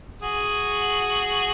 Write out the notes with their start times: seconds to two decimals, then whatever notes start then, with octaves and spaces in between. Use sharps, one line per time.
0.22 F#4 G#4